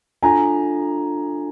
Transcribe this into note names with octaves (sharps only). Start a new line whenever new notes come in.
D4 F4 A4 G#5 A#5